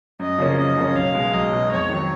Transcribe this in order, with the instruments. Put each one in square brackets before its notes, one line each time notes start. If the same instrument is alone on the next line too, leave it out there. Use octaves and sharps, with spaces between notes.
[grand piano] F#2 [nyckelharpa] D#5
[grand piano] C#3 F3 A#3 C#4
[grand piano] F#2 [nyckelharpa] D#5
[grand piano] C#3 F3 A#3 C#4
[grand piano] B1 [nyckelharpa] F5
[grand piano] B2 G#3
[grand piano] B1 [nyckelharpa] D#5
[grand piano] B2 G#3
[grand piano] F2 [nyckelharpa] C#5
[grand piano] D#3 F#3